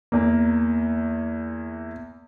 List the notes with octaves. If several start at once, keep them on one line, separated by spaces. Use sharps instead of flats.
E2 A#3